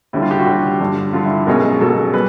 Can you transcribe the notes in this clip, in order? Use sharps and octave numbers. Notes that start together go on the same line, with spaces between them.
D#2 D3 G3 E4
F4
G4
F#4
D#2 D3 G3
G2 D3 G3
G2 D3 G3 F4
E4
B1 B2 G#3 C#4 A#4
A#4
B1 B2 G#3 C#4 A4
G3 B4